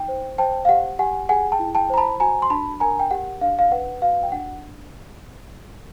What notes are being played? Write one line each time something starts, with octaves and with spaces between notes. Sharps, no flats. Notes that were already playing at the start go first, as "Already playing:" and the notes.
Already playing: D#4 G5
C5
C5 G5 A5
F5
G4 F#5
G4 F#5 G#5
G#4 F#5 G#5
G5 A5
E4
G5 A5
C5 A#5
A5 B5
F#4 G#5 A#5
C6
D4 A5 B5
A#4 G#5 A#5
G5
G4 F#5
D4 F5
F5
B4 F#5
F#4 F5
G5
D4 F#5